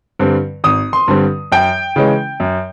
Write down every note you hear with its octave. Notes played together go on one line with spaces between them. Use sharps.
G2 D3 G3 C4
G#1 D#6
C6
G2 D3 G3 C4
F#2 G5
C#3 E3 G#3 C#4
F#2